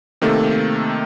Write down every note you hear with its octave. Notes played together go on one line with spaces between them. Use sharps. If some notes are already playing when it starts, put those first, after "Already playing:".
C3 D#3 A3 A#3 A4